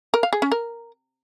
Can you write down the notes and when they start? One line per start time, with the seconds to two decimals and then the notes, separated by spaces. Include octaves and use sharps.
0.14 A#4
0.23 F5
0.33 G#4
0.42 C#4
0.52 A#4